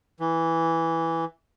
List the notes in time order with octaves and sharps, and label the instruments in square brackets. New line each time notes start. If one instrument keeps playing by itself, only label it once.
[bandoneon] E3